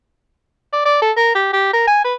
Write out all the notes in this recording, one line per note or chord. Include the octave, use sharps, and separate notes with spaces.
D5
D5
A4
A#4
G4
G4
A#4
G#5
B4